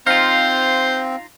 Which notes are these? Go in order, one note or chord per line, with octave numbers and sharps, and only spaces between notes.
C4 D#4 F4 C5 F5